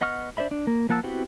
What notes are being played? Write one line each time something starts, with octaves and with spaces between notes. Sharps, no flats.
B3 D#5 F#5 C#6 F6
D4 C5 D5 E5 B5
D4
A#3
F3 A#3 F#5 A5 E6
B3 C4 E4 F#4 G4